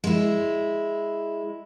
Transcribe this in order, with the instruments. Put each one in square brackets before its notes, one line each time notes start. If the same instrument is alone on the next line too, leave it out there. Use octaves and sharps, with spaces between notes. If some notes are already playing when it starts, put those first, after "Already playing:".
[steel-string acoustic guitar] G#3 E4